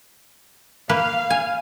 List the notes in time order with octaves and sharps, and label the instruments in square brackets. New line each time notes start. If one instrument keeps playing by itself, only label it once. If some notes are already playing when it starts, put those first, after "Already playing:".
[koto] A#3 B4 [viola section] F5
[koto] G#5